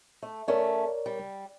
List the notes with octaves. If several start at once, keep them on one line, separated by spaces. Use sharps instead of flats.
A3
A3 C#4 A#4 C#5 D5
G3